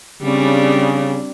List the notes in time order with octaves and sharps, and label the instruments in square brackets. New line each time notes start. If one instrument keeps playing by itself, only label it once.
[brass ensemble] C#3 [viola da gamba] G3 C4 D4